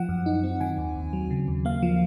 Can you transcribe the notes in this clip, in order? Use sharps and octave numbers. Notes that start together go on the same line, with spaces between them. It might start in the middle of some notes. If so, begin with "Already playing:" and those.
Already playing: F3 F#5
F#2
D#4
C4
D#3 G#5
D#2
D#2
F#3
C#3
D#2
A#3 F5
F3